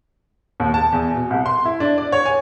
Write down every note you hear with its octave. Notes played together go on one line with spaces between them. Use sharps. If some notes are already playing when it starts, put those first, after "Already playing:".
D#2
A5
E2
B2
C2
C6
E4
D4
D5
C#5
G#5